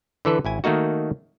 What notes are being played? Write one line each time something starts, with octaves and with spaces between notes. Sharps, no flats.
D3 E3 A4 B4
G#1 E4 G#5
D#3 A3 A#3 D#4 F#4